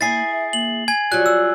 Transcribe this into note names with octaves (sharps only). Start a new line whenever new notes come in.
A#3 E4 G#4 A6 C7
E5
A#3 F#7
G#5 G#6
F#3 G3 F4 F#6
E6